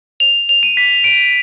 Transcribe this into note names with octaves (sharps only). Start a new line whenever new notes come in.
F7
F7
D#7
B6
D7